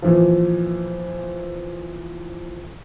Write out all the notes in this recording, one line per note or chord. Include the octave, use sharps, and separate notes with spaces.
A#2 E3 F3